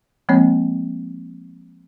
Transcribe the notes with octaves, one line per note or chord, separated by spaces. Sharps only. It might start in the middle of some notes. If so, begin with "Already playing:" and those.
F3 G#3 A#3 C4 C#5